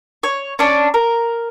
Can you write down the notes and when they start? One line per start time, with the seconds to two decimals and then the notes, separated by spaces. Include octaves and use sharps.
0.23 C#5
0.59 C#4 D4
0.94 A#4